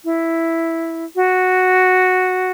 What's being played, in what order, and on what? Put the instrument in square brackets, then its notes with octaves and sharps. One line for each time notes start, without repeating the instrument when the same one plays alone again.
[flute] E4
F#4